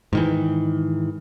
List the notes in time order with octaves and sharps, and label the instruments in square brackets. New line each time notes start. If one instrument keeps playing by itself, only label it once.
[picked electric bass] G#2 D#3 E3